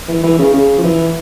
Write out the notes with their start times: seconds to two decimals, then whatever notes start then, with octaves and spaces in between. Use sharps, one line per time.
0.08 E3
0.23 E3
0.39 C#3
0.54 C#3
0.78 F3
0.83 E3